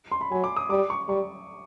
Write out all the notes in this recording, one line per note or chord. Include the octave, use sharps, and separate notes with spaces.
C6
B5
F#3 G#5
D6
D#6
G3 D6
C#6
G3 C#6